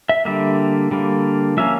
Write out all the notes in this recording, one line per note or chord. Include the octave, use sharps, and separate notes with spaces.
E5
D3 G3 A#3 E5
D3 G3 A#3
F3 A#3 C#4 E5